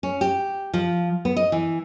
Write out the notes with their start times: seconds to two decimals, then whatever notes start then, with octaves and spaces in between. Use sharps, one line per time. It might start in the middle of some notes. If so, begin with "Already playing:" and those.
0.03 C#4
0.21 G4
0.74 F3
1.25 B3
1.37 D#5
1.52 E3